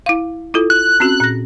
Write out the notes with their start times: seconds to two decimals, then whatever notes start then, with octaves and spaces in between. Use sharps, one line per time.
0.06 E4 F5
0.54 E4 F4 A4
0.70 F#6
1.00 C4 C#4 F#4
1.20 A#2 A#6